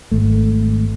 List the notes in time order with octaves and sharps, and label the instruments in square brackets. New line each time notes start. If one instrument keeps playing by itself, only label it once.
[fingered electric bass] G#1 A3